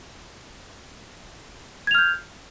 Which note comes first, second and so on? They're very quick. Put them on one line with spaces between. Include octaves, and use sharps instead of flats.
G#6 F7 F6 G6